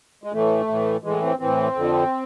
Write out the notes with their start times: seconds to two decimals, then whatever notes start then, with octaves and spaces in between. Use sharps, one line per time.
0.24 G#3
0.32 A2 E3 A3
0.68 A2 E3
1.04 A2 E3 G#3
1.22 C4
1.39 A2 E3 C4
1.75 F2 D3 F3